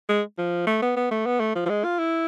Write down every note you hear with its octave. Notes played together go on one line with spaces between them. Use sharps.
G#3
F3
A3
B3
B3
A3
B3
A3
F3
F3
G#3
F4
E4